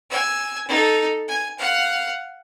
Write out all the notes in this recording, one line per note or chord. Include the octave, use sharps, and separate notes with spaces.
G#5 E6
D#4 A4
G#5
F5 F#5